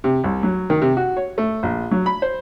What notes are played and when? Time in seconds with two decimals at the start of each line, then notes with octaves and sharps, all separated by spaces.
0.04 C3
0.24 C2
0.43 F#3
0.70 D#3
0.82 C3
0.97 F#4
1.17 C#5
1.38 A3
1.63 A#1
1.91 F#3
2.06 B5
2.22 C5